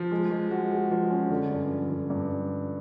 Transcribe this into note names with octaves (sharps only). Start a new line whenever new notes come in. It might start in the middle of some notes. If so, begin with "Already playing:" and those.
Already playing: F3
G#3
G#3
F#4
G#3
F3
C#4
D3
G2
F3
D3
G2